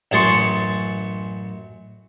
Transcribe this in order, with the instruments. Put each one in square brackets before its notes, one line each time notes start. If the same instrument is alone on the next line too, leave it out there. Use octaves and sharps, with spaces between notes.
[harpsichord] A1 F#2 G#4 A5 C6 C#6